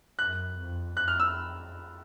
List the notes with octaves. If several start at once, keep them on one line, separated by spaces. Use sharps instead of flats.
F#2 F#6
F2
F2 F#6
F6
E6